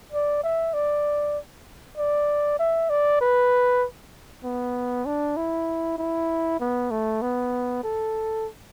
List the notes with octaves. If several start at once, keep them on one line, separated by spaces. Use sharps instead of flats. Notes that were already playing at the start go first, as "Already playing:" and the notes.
D5
E5
D5
D5
E5
D5
B4
B3
D4
E4
E4
B3
A3
B3
A4